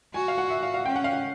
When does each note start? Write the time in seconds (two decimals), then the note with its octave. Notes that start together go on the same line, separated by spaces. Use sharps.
0.14 F#4 G#5
0.28 F5
0.38 F#5
0.50 E5
0.63 F5
0.74 F5
0.86 C#4 G5
0.96 F#5
1.04 F5
1.13 F#5